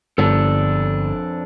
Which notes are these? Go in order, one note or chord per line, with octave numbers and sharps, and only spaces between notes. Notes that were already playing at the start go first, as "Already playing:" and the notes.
G1 F2 D4 A4